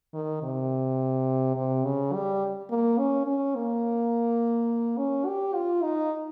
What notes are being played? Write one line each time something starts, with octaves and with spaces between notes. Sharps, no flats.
D#3
C3
C3
C#3
G3
A#3
C#4
C#4
A#3
C#4
G4
F4
D#4